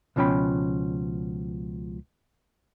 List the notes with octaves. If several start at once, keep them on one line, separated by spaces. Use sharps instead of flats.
C#2 B2 F3 C#4 G5 B5